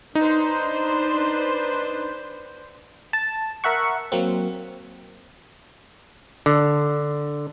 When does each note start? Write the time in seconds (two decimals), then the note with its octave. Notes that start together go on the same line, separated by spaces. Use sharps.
0.15 D4 D#4 B4 C5
3.13 A5
3.64 A#4 E5 F#5 C#6
4.12 F#3 A#3 C4
6.46 D3